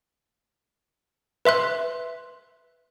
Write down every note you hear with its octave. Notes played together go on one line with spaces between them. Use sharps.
B4 E5 C6 F#6